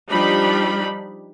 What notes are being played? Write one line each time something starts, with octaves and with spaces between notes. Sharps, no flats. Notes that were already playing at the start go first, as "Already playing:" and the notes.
F3 G3 D4 D#4 B5